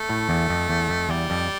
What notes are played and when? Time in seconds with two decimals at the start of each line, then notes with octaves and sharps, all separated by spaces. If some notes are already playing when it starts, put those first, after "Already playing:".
Already playing: A3
0.09 A2
0.29 E2
0.49 F2
0.69 E2
0.89 F2
1.09 E2 G3
1.30 F2